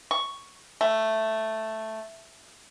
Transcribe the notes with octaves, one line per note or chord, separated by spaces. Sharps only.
C#6
A3